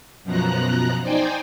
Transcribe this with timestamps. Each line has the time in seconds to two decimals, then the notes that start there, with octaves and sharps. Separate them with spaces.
0.24 F#2 B2 F3 A#5 F#6
1.01 D#4 C5 D5 G5 G#5